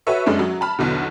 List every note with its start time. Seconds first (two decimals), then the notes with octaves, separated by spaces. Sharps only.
0.07 F#4 A4 B4 C#5 E5 C#6
0.26 F#2 G#3 A3 C#4 D4
0.39 F#3
0.61 A5 B5 F6
0.79 B1 E2 B2 D3